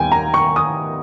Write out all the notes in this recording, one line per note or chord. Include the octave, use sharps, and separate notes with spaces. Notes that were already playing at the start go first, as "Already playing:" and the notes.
Already playing: D#2 D#3 G3 B3 G5 G#5
A#5
C#6
D#6